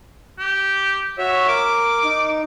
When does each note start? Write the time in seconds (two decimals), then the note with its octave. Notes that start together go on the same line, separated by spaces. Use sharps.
0.39 G4
1.18 F#4 C#5 E5
1.48 A#4 D6
2.04 D#4